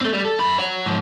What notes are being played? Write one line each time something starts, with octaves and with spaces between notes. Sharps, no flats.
A3 C4
G3
A4
F#2 B5
C#5 F#5
G#2 F3